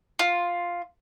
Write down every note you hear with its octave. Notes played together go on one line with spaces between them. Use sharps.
F4